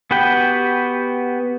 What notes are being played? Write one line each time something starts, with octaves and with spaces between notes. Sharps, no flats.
B3 F#4 G4 B4 G5